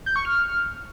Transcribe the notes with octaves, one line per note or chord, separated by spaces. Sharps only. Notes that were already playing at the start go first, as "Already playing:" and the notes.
G6
C#6
F6